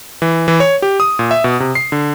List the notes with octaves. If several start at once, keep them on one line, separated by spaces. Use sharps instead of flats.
E3
E3
C#5
G4
D#6
A#2
E5
B2
C3
C7
D3